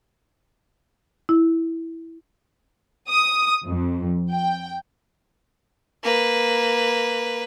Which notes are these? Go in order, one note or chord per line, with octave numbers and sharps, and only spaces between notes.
E4
D#6
F2
G5
A#3 B4